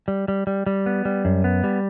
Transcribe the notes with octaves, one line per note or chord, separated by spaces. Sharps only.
G3
G3
G3
G3
B3
G3
F#2
B3
G3